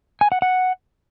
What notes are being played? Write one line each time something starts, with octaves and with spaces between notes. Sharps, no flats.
G#5
F#5
F#5